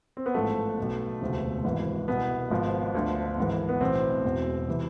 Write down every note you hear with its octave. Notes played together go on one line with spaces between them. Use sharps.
C4
B3
A1 G#2 F3 A3
B1 B2
E1 D2 C3 F3
G#1 G#2 E3
C2 B2 B3
G#1 G#2 F3
D2 D3 F3
G#1 G#2 E3
B3
B1 A2 E3 C4
E1 E2 B2
C3 E3